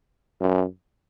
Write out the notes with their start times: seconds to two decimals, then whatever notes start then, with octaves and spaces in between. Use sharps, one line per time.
0.41 F#2